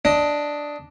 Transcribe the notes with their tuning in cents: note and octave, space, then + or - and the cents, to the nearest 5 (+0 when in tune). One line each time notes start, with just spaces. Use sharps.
D4 +0 D#5 +15